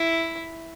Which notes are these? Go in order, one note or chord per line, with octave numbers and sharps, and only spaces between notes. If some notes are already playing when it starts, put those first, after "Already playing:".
Already playing: E4